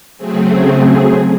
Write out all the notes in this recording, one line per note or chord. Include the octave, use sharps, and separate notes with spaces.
C#3 F#3 A3 C4 G#4
G#4